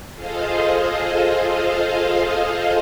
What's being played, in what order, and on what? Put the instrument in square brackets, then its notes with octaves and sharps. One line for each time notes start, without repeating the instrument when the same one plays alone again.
[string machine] F4 G#4 A4 C5 D#5 F5